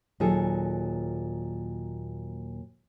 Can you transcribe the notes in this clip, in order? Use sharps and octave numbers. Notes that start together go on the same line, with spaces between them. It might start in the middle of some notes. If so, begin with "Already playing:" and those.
D#2 A#2 F#3 D#4 G#4 A4